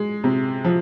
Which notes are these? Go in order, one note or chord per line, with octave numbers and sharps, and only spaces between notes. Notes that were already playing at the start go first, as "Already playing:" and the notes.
Already playing: G#3
C3
F3